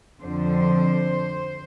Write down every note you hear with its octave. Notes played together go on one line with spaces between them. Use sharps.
F2 D3 F3 C5